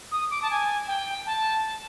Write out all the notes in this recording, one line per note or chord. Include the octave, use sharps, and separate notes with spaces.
D#6
D6
A5
G#5
G5
A5